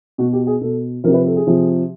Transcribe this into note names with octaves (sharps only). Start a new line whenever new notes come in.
B2 F#4
G4
G#4
B2 A4
C3 F3 A#4
B4
A4
G#4
C3 F3